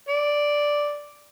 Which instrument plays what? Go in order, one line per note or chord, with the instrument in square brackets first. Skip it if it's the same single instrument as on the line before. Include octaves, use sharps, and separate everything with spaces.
[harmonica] D5